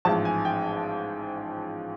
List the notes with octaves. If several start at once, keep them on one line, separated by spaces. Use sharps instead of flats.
A1 G#2 F3 A5
G#5
G5